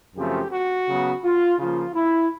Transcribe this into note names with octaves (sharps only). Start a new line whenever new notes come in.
F#2 C#3 F3 A3 C4 G4
F#4
C#3 F#3 B3
F4
C#3 F3 A#3 F4
E4